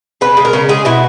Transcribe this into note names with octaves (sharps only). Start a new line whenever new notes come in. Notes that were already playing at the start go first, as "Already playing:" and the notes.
C#3 B4
G#3
A#4
C#3
G#3 G#4
B2 E4